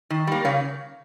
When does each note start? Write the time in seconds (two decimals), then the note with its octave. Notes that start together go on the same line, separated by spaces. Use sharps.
0.10 D#3
0.27 G3 A#3
0.45 C#3 C#5 F5